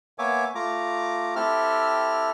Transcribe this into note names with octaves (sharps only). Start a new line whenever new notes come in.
A#3 B3 C#5 E5 G#5 D6
A3 F4 A#5 D6
C4 E4 G4 A4 E5 F6